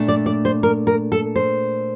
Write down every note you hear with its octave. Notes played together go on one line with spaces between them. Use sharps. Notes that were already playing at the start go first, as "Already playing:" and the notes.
Already playing: A#2 A3 D4
D5
D5
C5
A#4
A#4
A4
C5